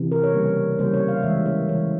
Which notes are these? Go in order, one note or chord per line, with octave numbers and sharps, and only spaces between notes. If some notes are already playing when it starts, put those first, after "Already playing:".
Already playing: C3 E3
A#4
C#5
C#3 G3 A#3
C#3 G3 A#3 C5
C#5
F5
C#3 E3 G#3 E5
C#5
C#3 E3 G#3 C#5